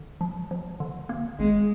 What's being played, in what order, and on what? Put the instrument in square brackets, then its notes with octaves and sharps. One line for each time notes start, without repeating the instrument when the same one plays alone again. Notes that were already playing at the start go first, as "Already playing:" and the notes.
Already playing: [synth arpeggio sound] D3
F3
F3
D3
A#3
[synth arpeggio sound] G#1 [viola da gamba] G#3